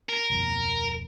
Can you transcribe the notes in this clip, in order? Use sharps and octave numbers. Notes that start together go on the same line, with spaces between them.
A#4
D1 B1 F2